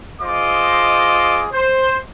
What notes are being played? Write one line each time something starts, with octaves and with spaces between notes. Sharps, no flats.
F4 G#4 C5 D#5 C6 D6
C5